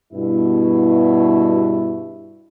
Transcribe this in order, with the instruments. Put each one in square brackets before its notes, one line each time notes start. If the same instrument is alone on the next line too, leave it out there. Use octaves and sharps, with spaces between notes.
[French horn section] G2 B2 E4